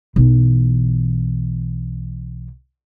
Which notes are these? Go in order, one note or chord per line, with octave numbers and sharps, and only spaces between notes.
B1 E3